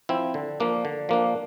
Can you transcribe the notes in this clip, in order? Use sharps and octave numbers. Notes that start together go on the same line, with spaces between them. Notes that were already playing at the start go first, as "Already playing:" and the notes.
F3 C4 E4
D3
F3 A#3 D4
D3
F3 A#3 D4